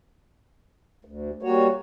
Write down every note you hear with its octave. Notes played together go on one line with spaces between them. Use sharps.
D2
G3 A#3 F#4 C#5